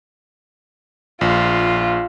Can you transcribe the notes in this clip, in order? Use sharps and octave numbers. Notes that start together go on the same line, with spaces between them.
A#1 F4